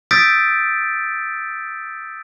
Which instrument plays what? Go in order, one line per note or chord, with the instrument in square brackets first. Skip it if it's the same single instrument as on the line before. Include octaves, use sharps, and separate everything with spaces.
[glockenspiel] D#6 E6 G6 A6 B6 D7